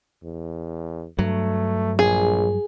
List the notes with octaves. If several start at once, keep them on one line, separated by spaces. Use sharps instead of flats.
E2
G2 F#3 A3
A#1 G#4